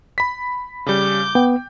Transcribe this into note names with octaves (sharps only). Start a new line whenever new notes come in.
B5 B6
C#3 G3 D6 G6
B3 G5